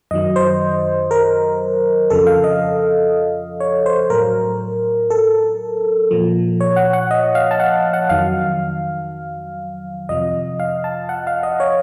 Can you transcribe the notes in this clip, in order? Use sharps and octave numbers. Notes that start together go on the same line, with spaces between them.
F#2 D#3 F#3 D#5
C5
A#4
F2 C#3 F3 A4
F5
D#5
C#5
C5
A2 F#3 A#4
A4
A#2 F3
C#5
F#5
F#5
D#5
F5
A5
F#5
F#5
F2 D#3 F#3 F5
F2 C3 F3 D#5
F5
A5
F#5
F5
D#5
C#5